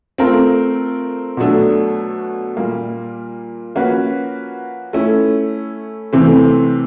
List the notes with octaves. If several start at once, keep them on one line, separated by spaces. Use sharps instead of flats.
A3 C4 F4 A#4
B2 F#3 A3 D4
A#2 G3 A#3
F3 A#3 C#4 F#4 B4
A3 C#4 E4
C3 E3 A3 C4